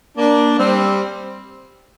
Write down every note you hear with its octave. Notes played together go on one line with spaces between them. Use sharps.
A#3 D4
G3 C4